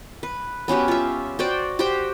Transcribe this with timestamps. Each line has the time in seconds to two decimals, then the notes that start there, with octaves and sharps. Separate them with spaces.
0.23 B4
0.68 B3 C#4 F#4 G4
0.88 F4 E5
1.39 F#4 C5 D5 G5
1.79 F#4 G4 C5 G5